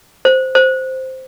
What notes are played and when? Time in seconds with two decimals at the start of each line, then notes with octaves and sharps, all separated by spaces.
0.25 C5
0.55 C5